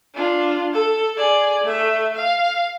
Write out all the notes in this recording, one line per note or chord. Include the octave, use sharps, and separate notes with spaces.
D4 F4
A4
G#4 D5
A3 E5
F5